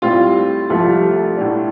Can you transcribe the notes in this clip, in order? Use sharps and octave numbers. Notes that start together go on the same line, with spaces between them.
A2 G3 C4 F4
C2 C3 F3 A3 F4
A2 A3 D4